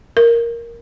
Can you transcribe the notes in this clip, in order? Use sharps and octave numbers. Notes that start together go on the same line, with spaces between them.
A#4